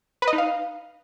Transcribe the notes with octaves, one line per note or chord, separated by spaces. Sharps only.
B4
D#5
D#4
F5